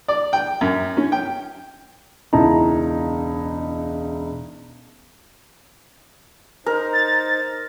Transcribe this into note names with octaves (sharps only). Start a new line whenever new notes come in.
D5
G5
F#2
C#4
G5
E1 C#2 D#4 E4 A5 A#5
D#4 A#4 C5
A6